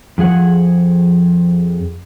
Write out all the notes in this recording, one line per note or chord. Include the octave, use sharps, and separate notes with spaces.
F2 F3 G#4 F#5